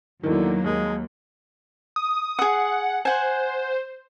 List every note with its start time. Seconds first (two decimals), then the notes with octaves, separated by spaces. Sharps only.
0.23 E2 D3 D#3 F#3 A#3
0.64 D#2 G#3
1.96 D#6
2.39 G#4 F#5 D#6
3.05 C5 F#5 G#5